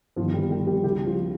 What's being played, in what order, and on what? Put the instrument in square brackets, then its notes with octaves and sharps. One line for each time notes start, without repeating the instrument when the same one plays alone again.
[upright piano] G1 G2 D#3 F3 F4
G3 G4
G3 G4
G3 G4
C#2 C#3 G3 G4
F3 F4